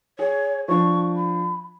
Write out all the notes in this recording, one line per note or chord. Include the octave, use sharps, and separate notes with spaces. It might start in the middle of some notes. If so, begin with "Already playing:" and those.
G#4 C#5
F3 D4 C#6
B5